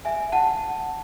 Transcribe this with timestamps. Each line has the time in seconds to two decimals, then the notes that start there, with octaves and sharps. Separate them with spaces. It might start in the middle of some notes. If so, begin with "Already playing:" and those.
0.05 E5 G#5
0.32 F#5 A5